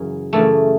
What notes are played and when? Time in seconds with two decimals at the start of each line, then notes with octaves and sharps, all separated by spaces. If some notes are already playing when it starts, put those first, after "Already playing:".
Already playing: F#2 C#3 E3
0.33 F#2 C#3 E3 A3